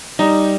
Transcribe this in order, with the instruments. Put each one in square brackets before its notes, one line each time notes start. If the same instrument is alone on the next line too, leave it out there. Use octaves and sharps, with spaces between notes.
[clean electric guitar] G3 [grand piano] D#4